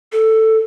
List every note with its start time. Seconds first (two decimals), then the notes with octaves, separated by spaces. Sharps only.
0.12 A4